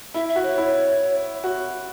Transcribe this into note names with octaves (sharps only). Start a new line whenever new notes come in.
E4 E5
E5
F#4
C#5
E4
F#4